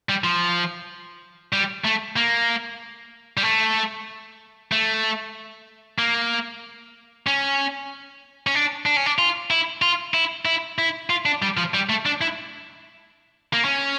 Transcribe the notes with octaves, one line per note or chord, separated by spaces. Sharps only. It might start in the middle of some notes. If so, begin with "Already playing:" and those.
G3
F3
G3
A3
A#3
G3
A3
A3
A#3
C#4
C#4
D4
D4
C#4
D4
F4
E4
F4
E4
E4
E4
F4
D4
G3
F3
G3
A3
D4
E4
A#3
C#4